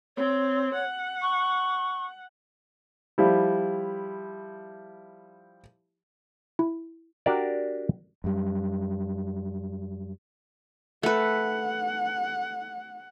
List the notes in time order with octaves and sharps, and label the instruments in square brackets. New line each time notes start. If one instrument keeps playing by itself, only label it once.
[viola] C4 [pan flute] C#5
[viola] F#5
[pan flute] C#6
[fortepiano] F3 G3 E4
[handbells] E4
[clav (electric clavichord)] D4 F#4 G4 A#4 D5
[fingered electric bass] F#2 G3
[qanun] A3 B4 [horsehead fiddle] F#5